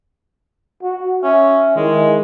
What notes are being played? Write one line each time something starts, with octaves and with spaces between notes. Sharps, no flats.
F#4
C#4 E5
D#3 G#3 E4